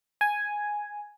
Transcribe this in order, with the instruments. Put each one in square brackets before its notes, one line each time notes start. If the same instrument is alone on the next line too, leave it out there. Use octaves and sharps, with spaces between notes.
[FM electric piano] G#5